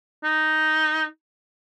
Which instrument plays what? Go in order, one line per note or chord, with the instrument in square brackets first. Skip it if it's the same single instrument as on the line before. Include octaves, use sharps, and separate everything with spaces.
[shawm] D#4